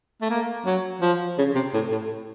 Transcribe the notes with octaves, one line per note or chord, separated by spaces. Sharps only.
A3
A#3
F#3
F3
C#3
C3
A2
A2